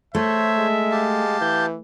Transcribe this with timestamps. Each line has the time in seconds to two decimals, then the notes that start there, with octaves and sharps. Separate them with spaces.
0.15 A3 C5 C#5 E5
0.57 G#3
0.91 G4 F5 A5
1.41 E3 G6